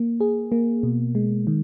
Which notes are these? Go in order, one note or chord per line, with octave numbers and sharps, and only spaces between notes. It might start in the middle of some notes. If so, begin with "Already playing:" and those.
Already playing: A#3
G#4
A#3
B2
G#3
D#3